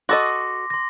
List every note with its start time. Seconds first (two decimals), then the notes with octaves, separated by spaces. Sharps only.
0.09 F#4 A4 D#5 C6 D6 A#6
0.70 C6 A#6